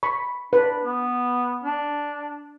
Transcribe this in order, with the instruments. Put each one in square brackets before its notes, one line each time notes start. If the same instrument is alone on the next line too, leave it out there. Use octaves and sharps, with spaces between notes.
[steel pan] B5 C#6
[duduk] D4 [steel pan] B4
[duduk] B3
D4